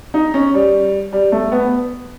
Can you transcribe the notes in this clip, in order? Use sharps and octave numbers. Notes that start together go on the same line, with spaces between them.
D#4
C#4
G3
G3
A3
B3